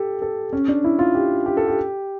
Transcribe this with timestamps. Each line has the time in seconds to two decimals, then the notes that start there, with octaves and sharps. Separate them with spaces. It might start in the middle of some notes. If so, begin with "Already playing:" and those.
Already playing: G4 A4
0.22 A4
0.53 C#4
0.68 D4
0.84 E4
0.99 F4
1.15 G4
1.46 G4
1.57 A4
1.68 G4